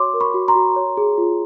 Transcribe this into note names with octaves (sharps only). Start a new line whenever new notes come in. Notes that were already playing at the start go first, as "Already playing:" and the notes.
Already playing: F#4 C#5 C6 D6
A#4
B5 C#6
F#4
A#5 C6
F#4
C#5
G#4
F4